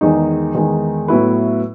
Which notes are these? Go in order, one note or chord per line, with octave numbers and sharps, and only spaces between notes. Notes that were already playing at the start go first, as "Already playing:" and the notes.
E2 D#3 G#3 D#4
E2 D#3 G#3 D#4
A2 F#3 B3 E4 B4